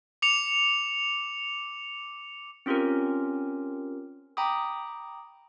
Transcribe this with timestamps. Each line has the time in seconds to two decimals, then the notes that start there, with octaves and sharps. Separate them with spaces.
0.22 D6 C#7 F7
2.66 C4 C#4 F4 G4 A#4
4.37 G5 A#5 B5 D6 D#6